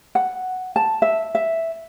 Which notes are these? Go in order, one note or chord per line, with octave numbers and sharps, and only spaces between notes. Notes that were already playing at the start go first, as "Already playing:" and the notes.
F#5
A5
E5
E5